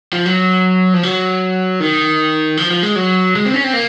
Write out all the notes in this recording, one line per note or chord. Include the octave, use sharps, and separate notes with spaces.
F3
F#3
F3
F#3
D#3
F3
F3
G#3
F#3
G#3
C4
C#4
C4
A#3